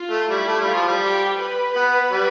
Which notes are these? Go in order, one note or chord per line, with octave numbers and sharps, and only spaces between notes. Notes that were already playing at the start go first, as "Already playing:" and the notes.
Already playing: F4
A3
G3 E4
A3
G3
F4
F3
G3
G4
B4
B3
G3